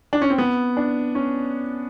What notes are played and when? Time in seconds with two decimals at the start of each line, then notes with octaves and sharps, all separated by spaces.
0.13 D4
0.22 C#4
0.30 C4
0.38 B3
0.77 D4
1.15 C#4